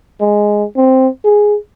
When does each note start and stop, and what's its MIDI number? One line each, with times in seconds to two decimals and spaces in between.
0.21 0.64 56
0.77 1.08 60
1.24 1.56 68